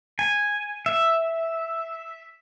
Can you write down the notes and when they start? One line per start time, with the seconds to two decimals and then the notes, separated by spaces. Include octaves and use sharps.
0.19 G#5
0.86 E5